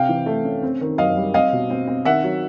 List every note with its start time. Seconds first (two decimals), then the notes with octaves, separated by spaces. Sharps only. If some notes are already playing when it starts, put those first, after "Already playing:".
Already playing: C3 F5 G5
0.09 E3
0.26 A3
0.44 C#4
0.63 C4
0.81 D#3
0.98 F#2 D#5 F5
1.16 G3
1.34 C4 D#5 F5
1.53 B2
1.70 C4
1.87 C4
2.05 D#3 E5 F#5
2.23 F#3